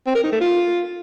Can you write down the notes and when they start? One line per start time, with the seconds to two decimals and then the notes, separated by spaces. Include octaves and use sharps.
0.06 C4
0.15 A#4
0.23 D#4
0.32 A3
0.40 F4